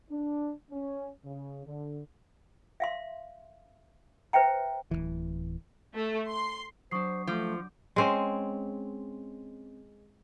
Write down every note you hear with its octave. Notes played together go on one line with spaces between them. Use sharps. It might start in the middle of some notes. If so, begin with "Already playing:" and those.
D4
C#4
C#3
D3
E5 F5 C6
B4 C5 E5 G5 A#5
D1 A#1 E3
A3
C6
F#3 D4 C5 C#6 D#6 C7
F3 A3 D6 G6
G#3 C4 C#4